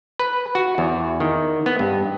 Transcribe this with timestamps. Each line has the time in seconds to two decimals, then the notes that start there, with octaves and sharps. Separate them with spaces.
0.19 B4
0.55 F#4
0.78 E2
1.20 D#3
1.66 B3
1.79 G2